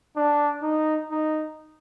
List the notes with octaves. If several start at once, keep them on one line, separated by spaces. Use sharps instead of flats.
D4
D#4
D#4